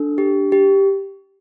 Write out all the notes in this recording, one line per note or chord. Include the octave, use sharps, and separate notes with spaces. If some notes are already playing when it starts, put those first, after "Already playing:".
Already playing: D4 A4
G4
G4